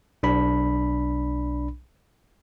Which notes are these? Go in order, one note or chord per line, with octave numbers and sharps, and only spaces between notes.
B1 D4 B5